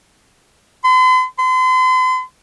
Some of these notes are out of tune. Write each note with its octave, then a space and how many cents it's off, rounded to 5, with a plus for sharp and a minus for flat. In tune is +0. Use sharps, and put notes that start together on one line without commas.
C6 -45
C6 -40